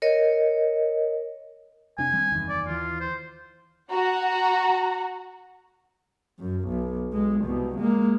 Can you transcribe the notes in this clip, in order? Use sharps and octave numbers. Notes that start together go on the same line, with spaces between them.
A#4 C#5 D#5
F1 C3 D4 G#5
D#3 G3 C4
F#1 E2 D#3
D5
D#2 E3 F4
C5
F#4 F#5 A#5
F#2
B1
B1 G#3
C2 B2
G#3 A#3